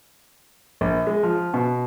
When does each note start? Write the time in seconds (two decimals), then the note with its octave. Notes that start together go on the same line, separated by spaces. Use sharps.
0.81 A#1
1.07 G#3
1.23 F3
1.54 B2